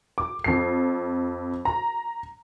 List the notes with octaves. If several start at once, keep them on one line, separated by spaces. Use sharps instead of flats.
D6
F2 C7
A#5